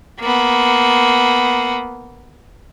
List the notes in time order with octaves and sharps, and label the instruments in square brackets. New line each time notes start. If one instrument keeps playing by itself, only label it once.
[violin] A#3 B3